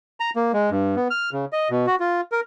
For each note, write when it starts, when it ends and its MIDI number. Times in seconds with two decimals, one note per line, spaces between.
0.20 0.30 82
0.36 0.52 58
0.53 0.70 56
0.71 0.95 43
0.96 1.08 59
1.10 1.30 89
1.33 1.45 49
1.53 1.68 75
1.70 1.86 47
1.87 1.96 66
2.00 2.21 65
2.32 2.40 70